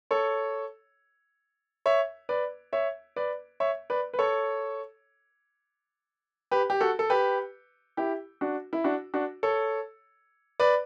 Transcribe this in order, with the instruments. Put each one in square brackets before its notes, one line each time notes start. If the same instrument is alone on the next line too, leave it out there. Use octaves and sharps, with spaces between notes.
[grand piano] A4 C#5
C#5 E5
B4 D5
C#5 E5
B4 D5
C#5 E5
B4 D5
B4
A4 C#5
G4 B4
G4
F#4 A4
A4
G4 B4
E4 G4
D4 F#4
E4
D4 F#4
D4 F#4
A4 C#5
B4 D5